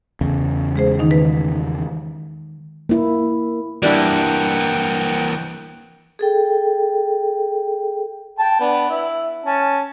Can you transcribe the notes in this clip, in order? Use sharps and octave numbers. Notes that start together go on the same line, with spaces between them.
E2 C#3
G#3 G#4 C5
D#3 D#4
B4
A#3 E4
E3 G3 A#3 D4 E4 F#5 G5
G#4 A4 G5
G5 A5
B3 D4
E4
C#4 A5